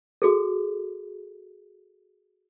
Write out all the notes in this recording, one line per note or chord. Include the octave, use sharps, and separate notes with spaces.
F#4 G#4 A4